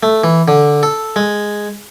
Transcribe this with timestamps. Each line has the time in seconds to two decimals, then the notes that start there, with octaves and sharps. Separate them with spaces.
0.03 A3
0.24 E3
0.48 D3
0.83 A4
1.16 G#3